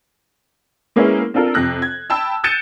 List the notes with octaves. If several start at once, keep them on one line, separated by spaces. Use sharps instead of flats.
G#3 A#3 B3 C#4 E4 G#4
C4 D4 F4 A4 A#4
F2 C3 F#6 A#6
G#6
G5 A5 B5 E6
F#6 G6 A6 C#7 D#7 E7